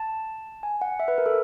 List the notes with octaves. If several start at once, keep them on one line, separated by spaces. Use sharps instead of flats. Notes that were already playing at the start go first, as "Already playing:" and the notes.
Already playing: A5
G#5
F#5
E5
B4
A#4
A4